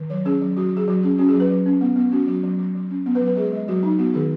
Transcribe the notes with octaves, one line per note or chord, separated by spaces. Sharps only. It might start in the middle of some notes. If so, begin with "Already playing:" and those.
Already playing: D#3
F#3 C#5
C#4 G#4
F#3
F#3 F#4
F#3 G#4
F#3 F#4
C#4 G#4
C#4 F#4
G#4
F#3
B4
F#3
C#4
B3
B3
C#4 F#4
F#3 F#4
F#3
F#3
F#3
C#4
B3
B4
F#3
B4
G#3 G#4
G#3
F#3 F#4
F#3 D#4
B3 F#4
D#3 G#4